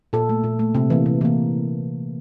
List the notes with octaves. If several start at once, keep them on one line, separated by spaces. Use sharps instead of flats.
A#2 A4
A3
A#2
A3
C3
E3 A#3
C3
E3 A#3